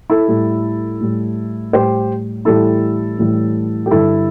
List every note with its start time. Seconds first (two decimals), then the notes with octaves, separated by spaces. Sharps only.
0.10 E4 A4
0.28 A2 G3
1.01 A2 G3
1.73 A2 G3 G4 C5
2.45 A2 E3 G3 E4 A4
3.19 A2 E3 G3
3.86 G4
3.91 G2 D3 G3 E4 A4